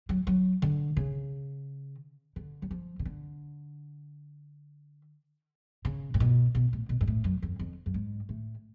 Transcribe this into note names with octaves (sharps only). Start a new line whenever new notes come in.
F#3
F#3
D3
C#3
D3
F#3
F3
C#3
D3
C#3
A2
B2
B2
A2
B2
G#2
A2
F#2
F2
F2
F#2
G#2
A2